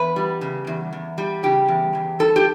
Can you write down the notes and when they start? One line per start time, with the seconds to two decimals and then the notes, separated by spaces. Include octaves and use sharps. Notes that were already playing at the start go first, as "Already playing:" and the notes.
Already playing: E2 B4
0.16 G3
0.41 C#3
0.67 E2
0.93 E2
1.18 G3
1.43 C#3 G4
1.68 E2
1.95 E2
2.19 G3 A4
2.36 G4